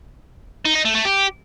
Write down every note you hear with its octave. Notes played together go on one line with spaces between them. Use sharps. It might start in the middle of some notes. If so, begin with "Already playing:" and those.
D#4
D#4
A3
A3
G4